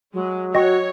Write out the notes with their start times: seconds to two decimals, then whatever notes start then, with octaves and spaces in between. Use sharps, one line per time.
0.14 F#3 G#3
0.55 F#4 C#5 D#5 G5 C#6